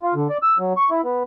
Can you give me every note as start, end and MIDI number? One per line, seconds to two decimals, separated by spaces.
0.03 0.14 65
0.15 0.28 50
0.30 0.38 74
0.43 0.58 88
0.58 0.73 54
0.77 0.90 85
0.91 1.01 64
1.04 1.23 59